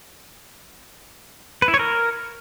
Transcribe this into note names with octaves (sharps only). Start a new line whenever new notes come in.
B4
E4
C#5
A#4